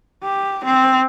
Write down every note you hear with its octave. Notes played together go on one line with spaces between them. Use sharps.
G4
C4